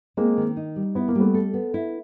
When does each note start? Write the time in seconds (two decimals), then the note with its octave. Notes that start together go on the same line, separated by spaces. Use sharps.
0.17 G#3 A#3 C4
0.37 D#3
0.57 D#4
0.76 G3
0.95 B3 E4
1.08 A#3
1.15 G3 A3 B3
1.34 A4
1.54 B3
1.74 E4